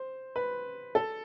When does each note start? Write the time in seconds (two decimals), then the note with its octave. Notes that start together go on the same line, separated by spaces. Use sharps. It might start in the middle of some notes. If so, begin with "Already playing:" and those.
Already playing: C5
0.36 B4
0.95 A4